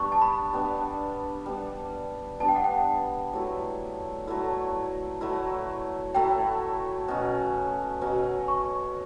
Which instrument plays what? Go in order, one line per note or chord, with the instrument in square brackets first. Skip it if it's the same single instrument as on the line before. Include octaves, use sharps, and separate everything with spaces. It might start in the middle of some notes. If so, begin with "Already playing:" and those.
Already playing: [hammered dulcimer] G3 B3 D4 [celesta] C#6
[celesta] A5
B5
[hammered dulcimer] G3 B3 D4
G3 B3 D4
[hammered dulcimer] G3 B3 D4 [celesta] A5
[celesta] G5
F#5
G5
[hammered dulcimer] F#3 A3 E4
F#3 A3 E4
F#3 A3 E4
[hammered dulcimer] F#3 A3 E4 [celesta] G5
[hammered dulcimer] B2 F#3 C#4
B2 F#3 C#4
[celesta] C#6